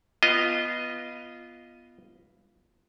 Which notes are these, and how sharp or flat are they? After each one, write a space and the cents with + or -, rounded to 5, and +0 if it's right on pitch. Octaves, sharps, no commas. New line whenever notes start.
B3 +0 F4 -15 D#5 +0